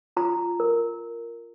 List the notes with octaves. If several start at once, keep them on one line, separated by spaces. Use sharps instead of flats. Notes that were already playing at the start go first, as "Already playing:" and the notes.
F4 A#5
A#4